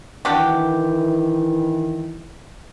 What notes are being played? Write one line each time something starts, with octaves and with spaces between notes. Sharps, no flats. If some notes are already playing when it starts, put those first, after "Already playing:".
D#3 E3 D4 F#4 G4